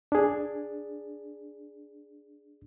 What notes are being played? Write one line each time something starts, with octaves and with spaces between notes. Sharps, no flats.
D4 G#4